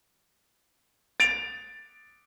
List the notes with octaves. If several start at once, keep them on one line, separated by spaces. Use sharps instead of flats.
A6 D7 F7